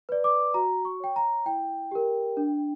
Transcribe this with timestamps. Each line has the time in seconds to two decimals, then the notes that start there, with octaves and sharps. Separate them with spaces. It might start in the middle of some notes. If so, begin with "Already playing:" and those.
0.09 B4 D5
0.24 D6
0.54 F#4 A#5
0.85 C#6
1.00 C#5 G5
1.16 A#5
1.46 E4 G5
1.91 G4 A#4
2.37 D4